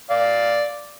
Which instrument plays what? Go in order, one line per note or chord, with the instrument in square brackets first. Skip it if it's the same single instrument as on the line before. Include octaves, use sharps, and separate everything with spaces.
[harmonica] D5 F5